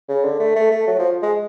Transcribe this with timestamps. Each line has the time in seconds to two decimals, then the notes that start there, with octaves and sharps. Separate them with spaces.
0.09 C#3
0.24 D3
0.40 A3
0.56 A3
0.71 A3
0.87 F#3
0.99 F3
1.23 G#3